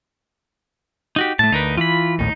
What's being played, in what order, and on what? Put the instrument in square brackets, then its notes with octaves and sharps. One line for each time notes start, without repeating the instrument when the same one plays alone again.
[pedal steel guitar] D#4 F#4 G4
[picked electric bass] A2 [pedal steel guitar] A3 A5
[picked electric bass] D2 [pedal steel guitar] D#4 A#4 B4
[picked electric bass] E3 [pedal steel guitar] F4 B5
[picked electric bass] A#1 D#2 A2 [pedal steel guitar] D#4